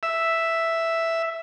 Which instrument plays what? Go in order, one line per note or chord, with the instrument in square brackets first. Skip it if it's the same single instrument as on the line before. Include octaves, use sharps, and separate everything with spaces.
[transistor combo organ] E5